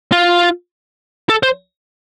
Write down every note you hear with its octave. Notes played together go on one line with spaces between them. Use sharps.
F4
A4
C5